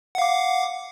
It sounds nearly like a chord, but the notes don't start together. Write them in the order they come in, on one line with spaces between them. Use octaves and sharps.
F#5 F5 D6